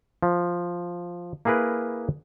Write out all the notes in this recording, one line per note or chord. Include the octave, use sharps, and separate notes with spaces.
F3
A#3 E4 G#4 A#4 B4